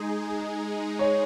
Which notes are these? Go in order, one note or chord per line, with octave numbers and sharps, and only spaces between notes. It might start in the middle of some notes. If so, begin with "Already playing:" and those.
Already playing: G#3 D#4 G#4
C#5